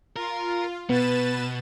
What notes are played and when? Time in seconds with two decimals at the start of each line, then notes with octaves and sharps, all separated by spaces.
0.16 F4 A#4
0.90 B2 B3 B4 A6 E7